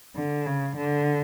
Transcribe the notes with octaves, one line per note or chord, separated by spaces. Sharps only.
D3
C#3
D3